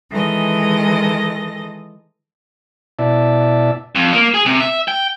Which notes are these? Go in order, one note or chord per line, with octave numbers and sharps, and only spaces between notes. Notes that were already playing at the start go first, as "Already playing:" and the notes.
D#3 E3 G#3 A4 D#5 A#6
B2 E4 D5 E5 A5
F2
A#3
G#4
C3
E5
G5